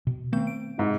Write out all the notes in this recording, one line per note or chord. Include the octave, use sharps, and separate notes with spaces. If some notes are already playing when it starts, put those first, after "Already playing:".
B2
D#3 A3 B3 C4 G6
D7
G#2 C3